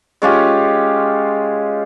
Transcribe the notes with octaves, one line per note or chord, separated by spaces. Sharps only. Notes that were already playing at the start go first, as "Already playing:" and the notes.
G#3 C#4 F4 G4